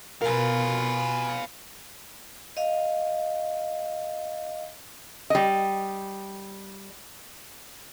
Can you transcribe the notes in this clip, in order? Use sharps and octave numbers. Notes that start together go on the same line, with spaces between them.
B2 F4 A#4 B4 F5 G#5
D#5 F5
G3 D#5